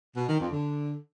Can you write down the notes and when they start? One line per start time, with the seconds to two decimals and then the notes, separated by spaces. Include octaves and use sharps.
0.16 B2
0.28 D#3
0.39 F2
0.51 D3